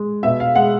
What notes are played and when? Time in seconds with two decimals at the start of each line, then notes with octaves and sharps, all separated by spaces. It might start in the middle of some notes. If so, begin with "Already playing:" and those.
Already playing: G#3
0.23 B2 E5
0.40 F5
0.55 G#3 F#5